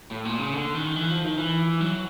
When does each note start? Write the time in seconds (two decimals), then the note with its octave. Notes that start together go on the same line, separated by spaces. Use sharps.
0.11 A2
0.25 A#2
0.39 C#3
0.54 D3
0.75 D#3
0.96 E3
1.11 F3
1.24 D#3
1.38 E3
1.81 F#3